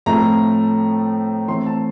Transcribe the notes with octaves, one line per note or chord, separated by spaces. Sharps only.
A2 F3 A3 C4 A#5
E3 A3 C4 C6
A5